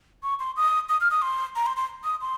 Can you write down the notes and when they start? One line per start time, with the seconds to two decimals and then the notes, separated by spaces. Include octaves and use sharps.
0.23 C#6
0.39 C6
0.57 D#6
0.89 D#6
1.01 F6
1.11 D#6
1.22 C6
1.56 A#5
1.66 C6
1.77 C6
2.04 D#6
2.21 C6